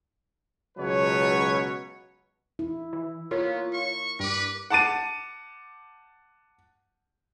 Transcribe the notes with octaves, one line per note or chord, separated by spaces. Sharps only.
C#2 B2 F#3 B4 C#5
E4
E3
B3 F4 A#4 C#5
C#6
G2 B4 D6
F#5 A5 D6 A6 D#7